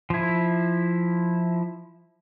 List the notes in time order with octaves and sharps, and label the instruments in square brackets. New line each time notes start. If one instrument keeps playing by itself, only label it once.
[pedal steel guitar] F3 E4